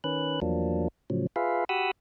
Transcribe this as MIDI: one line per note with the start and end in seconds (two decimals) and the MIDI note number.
0.04 0.40 51
0.04 0.40 61
0.04 0.40 71
0.04 0.40 90
0.42 0.88 40
0.42 0.88 53
0.42 0.88 54
0.42 0.88 58
0.42 0.88 62
1.10 1.27 45
1.10 1.27 49
1.10 1.27 53
1.10 1.27 54
1.36 1.65 65
1.36 1.65 68
1.36 1.65 71
1.36 1.65 76
1.36 1.65 77
1.69 1.91 66
1.69 1.91 67
1.69 1.91 78
1.69 1.91 83
1.69 1.91 87
1.69 1.91 88